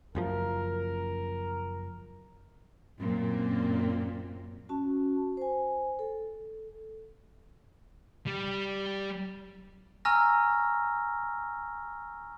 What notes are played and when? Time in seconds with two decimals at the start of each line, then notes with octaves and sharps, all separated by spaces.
0.15 F#1 F#2 F3 A#4
2.99 F#2 A#2 A#3 C4
4.69 C#4 F#4 A5
5.37 C5 G#5
5.99 A4
8.27 G3
10.05 G#5 A#5 C#6 E6 F6 A#6